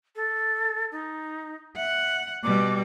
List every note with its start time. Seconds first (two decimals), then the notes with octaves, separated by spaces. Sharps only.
0.16 A4
0.92 D#4
1.76 E5 F#5
2.44 B2 G3 D6